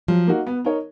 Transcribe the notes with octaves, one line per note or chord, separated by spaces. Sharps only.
F3 F#3
A#3 D#4 F#4
B3
D#4 A#4 C#5